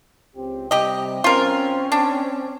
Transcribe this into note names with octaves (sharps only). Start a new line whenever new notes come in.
C#2 C4 G4
C3 G3 G4 D#5
C4 C#4 F4 A#4
D4